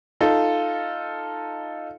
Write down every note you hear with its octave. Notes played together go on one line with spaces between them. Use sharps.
D#4 F4 A4